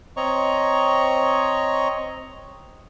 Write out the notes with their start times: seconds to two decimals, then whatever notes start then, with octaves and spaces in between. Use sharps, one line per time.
0.17 C4 C#5 D#5 A#5 C#6